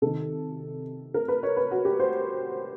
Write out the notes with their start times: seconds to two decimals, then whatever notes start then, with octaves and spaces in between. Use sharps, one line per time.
0.02 C3 D#3 A4
1.14 A#4
1.28 B4
1.43 C#5
1.57 B4
1.71 F#4
1.85 G4
1.99 C5